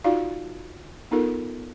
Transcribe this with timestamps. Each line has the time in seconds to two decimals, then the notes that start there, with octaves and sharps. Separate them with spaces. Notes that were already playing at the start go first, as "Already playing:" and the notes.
0.04 D#4 F4 F#4 D5 F5
1.11 B3 D#4 F4 A4 A#4